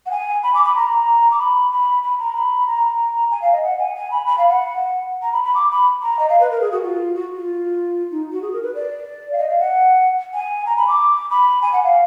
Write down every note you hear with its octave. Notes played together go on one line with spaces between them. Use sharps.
F#5
G#5
B5
D6
B5
A#5
D6
B5
B5
B5
A#5
B5
A#5
G#5
F5
D#5
F#5
G#5
G#5
B5
B5
F5
F#5
A#5
B5
B5
D6
B5
A#5
D#5
F5
B4
A#4
G#4
F#4
F4
F#4
F4
D#4
F#4
G#4
A#4
B4
D5
F5
D#5
F5
F#5
G#5
A#5
B5
D6
B5
G#5
F#5
F5